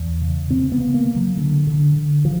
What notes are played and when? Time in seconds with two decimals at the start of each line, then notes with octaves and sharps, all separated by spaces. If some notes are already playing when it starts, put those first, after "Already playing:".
Already playing: E2
0.21 C#3
0.50 C#3 C4
0.72 B3
0.80 C#3
0.94 A#3
1.08 C#3
1.15 F#3
1.37 D3
1.67 D3
1.96 D3
2.25 F3